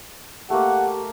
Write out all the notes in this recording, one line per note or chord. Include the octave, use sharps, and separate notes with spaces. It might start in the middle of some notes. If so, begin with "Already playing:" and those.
A3 A#3 G4 F#5